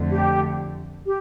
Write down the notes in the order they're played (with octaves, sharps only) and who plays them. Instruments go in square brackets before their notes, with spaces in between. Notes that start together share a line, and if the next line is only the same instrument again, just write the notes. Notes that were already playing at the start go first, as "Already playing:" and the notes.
Already playing: [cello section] F2 D3 A3
[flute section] G4
G4